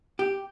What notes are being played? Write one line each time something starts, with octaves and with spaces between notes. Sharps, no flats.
G4